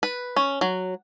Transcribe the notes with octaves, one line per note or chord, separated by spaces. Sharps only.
B4
C#4
F#3